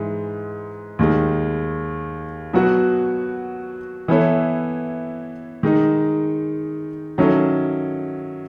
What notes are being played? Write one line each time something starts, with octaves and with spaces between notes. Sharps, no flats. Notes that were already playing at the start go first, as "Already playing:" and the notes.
Already playing: G#2 E3 G#3
D#2 D#3 G#3
B2 F#3 B3 F#4
E3 B3 E4 A4 C#5
D#3 G#3 D#4
D#3 F#3 C#4 E4 A4